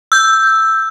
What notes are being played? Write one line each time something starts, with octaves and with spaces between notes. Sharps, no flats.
E6 G6